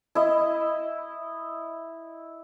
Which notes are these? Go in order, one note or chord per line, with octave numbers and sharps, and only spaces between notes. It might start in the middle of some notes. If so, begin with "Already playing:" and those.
E4 D#5